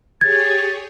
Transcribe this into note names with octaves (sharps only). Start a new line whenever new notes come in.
G4 G#4 C#5 G#6 A6